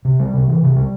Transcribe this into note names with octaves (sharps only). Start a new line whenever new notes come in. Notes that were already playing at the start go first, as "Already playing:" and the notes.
C3
G3
C3
E3
C3
G3